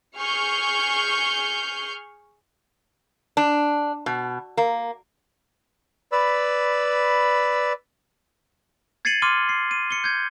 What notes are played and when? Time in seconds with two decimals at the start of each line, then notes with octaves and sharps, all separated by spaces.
0.16 G#4 C#6 F6 G6
3.37 D4
4.06 B2
4.57 A#3
6.12 B4 D5 B5 E6
9.05 G#6 A6 C7 C#7 D#7 F#7
9.22 C6 D6 F6 D#7 G7
9.49 C7
9.71 D#7
9.91 C#7 G7
10.04 G6 G#6